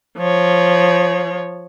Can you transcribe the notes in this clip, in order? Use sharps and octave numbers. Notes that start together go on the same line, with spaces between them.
F3 C#5